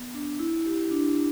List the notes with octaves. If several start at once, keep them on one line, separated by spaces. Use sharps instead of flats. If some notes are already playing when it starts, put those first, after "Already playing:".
Already playing: B3
D4
E4
G4
D4